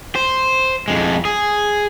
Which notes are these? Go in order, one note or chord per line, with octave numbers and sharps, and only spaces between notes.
C5
F2 G#3
G#4